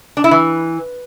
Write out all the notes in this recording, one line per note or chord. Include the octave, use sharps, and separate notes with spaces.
D4
E4
E3